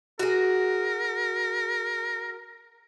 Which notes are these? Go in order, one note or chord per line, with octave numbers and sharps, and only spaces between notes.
F#4 G#4 A#4